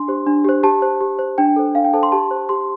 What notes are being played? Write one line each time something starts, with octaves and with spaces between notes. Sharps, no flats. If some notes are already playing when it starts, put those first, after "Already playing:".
Already playing: D4 C6
G4 C5
D4
G4 C5
G4 A5
C5
G4
C5
D4 G5
A4 C5
D4 F5
G5
A4 C5 A5
C6
G4 A5
C5
G4 C6